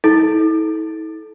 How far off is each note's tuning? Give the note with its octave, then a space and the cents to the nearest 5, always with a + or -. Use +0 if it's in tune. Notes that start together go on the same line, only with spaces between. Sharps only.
E4 -45 A4 -20